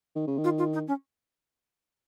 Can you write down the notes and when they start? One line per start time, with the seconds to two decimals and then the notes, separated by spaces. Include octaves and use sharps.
0.16 D#3
0.27 C#3
0.38 D#3
0.44 F4
0.58 F4
0.73 D#4
0.88 C#4